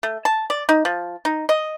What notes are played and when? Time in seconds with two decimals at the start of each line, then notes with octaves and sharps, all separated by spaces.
0.03 A3
0.25 A5
0.50 D5
0.69 D#4
0.85 F3
1.25 D#4
1.49 D#5